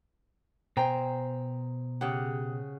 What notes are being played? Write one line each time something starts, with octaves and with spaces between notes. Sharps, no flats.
B2 C5 G5 G#5 A#5
C#3 C#4 G4 G#4 F#5